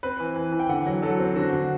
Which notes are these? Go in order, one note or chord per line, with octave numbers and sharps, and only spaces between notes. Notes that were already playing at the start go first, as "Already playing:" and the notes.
C4 B4
E3
E3
E3
G5
D3 F#5
F#3
F#3 A4
C4
D3 F#4
D3